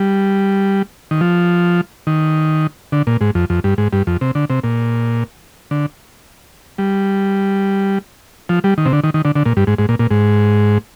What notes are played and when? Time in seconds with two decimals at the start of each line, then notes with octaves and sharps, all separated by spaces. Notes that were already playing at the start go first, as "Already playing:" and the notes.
Already playing: G3
1.11 D#3
1.21 F3
2.07 D#3
2.92 D3
3.07 A#2
3.21 G#2
3.35 F2
3.50 F2
3.64 G2
3.78 G#2
3.93 G2
4.07 F2
4.21 C3
4.35 D3
4.50 C3
4.64 A#2
5.71 D3
6.78 G3
8.49 F3
8.64 G3
8.78 D#3
8.86 C3
8.93 D3
9.04 D#3
9.14 D#3
9.25 D3
9.36 D3
9.46 A#2
9.57 G2
9.67 G#2
9.79 G#2
9.89 A#2
9.99 A#2
10.11 G#2